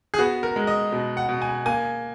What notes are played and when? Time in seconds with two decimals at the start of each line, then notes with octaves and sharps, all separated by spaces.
0.14 G#4
0.19 B3 F#4
0.43 A#4
0.56 G#3
0.67 D#5
0.92 B2
1.17 F#5
1.29 B2
1.42 G#5
1.66 A#3 G#5